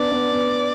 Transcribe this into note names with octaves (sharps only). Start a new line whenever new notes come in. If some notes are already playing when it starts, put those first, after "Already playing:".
Already playing: B3 D4 D5
B3 D4
B3